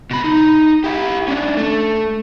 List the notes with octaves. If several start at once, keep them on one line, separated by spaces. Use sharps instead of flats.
B2 B5
D#4
E4 G4
C#4 D4
A3